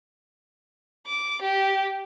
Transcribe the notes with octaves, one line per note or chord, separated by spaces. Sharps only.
D6
G4